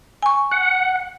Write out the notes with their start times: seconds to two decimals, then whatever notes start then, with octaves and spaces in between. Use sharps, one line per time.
0.22 G#5 C#6
0.51 F#5